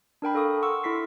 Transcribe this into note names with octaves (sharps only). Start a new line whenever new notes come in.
D4 A#4 G5 B5
A4 F5 C#6 D#6
F#5 C6 C#6 E6
E4 A4 B6 C7